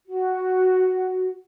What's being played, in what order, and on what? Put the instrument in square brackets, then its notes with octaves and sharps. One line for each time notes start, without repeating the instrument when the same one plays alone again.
[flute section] F#4